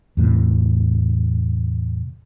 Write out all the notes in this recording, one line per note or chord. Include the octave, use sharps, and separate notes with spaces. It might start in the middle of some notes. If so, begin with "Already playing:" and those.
E2 A2 C3